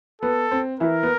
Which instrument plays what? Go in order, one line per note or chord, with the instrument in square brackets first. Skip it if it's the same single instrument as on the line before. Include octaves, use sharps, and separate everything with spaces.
[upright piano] B3 [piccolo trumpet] A4
[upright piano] C4
[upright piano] E3 E4 [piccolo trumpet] A#4
[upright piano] B3